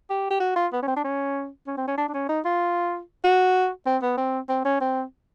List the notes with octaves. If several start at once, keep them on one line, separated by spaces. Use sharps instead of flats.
G4
G4
F#4
F4
B3
C#4
C4
D4
C#4
C#4
C4
C#4
D4
D4
C#4
D#4
F4
F#4
C4
B3
C4
C4
C#4
C4